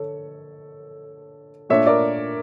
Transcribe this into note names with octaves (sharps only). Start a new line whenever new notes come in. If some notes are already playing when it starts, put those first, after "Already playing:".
Already playing: D3 A4 C#5
A#2 A3 D4 F4 C#5 E5
A#4 D5